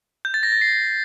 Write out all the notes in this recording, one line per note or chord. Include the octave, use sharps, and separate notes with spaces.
G6
A6
A#6
A6
C7